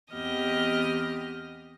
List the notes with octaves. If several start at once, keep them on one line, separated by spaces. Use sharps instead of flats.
E2 B3 C4 G4 D#5 F6